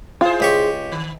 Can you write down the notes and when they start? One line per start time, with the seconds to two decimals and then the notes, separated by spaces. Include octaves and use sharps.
0.21 E4 F4 G#4 C5
0.40 C#2 G4 C#6
0.92 D#3